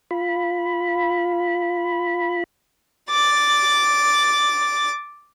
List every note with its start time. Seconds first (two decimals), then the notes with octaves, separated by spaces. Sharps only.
0.11 F4 B5
3.10 D6 A6